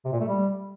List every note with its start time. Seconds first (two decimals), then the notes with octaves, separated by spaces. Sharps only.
0.05 C3
0.13 A#2
0.20 A3
0.28 G3